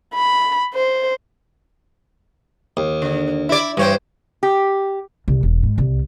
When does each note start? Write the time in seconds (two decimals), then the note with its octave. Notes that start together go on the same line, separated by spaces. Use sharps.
0.14 B5
0.74 C5
2.77 D#2
3.02 D3
3.49 E4 D5
3.77 G2 E3 C5 C#5 G5
4.43 G4
5.28 C2
5.43 E1
5.63 G#2
5.78 C2